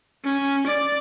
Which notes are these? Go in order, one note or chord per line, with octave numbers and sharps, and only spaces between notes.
C#4
D5